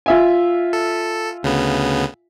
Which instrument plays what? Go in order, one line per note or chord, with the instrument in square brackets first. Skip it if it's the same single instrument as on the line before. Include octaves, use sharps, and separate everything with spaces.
[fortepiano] F4 E5 G#5
[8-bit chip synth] A4
D2 C#3 B3